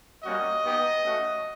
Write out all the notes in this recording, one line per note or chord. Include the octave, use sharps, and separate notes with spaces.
G3 A#3 C#4 F#4 D#5
B3 D#4 G4
A3 C#4 F#4